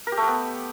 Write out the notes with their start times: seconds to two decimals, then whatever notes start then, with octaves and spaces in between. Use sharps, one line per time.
0.07 A#4
0.12 G4
0.17 A3
0.22 G4
0.28 B3